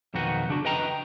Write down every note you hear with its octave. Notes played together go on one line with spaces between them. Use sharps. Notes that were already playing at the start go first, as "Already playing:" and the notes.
B1 F2 D#3 D#4 F#4 B4
C#3 D4 F#4
B4 D#5 G5 A#5